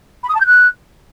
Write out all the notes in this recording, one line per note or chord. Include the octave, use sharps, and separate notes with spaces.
B5
D#6
A5
G6
F#6